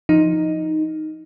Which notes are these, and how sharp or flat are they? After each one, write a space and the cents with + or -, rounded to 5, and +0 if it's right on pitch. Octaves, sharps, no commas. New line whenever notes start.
F3 +0 D#4 +0